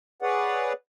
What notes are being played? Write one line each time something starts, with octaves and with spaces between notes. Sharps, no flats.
G#4 B4 C#5 D5 F#5